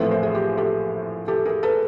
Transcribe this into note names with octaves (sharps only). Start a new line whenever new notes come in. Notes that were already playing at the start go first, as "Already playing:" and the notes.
Already playing: A#1 A2 E3 A3 C4 A4 B4
A#4 C5
G#4
G4
G4 A4
G4 A4
G#4 A#4
A4 B4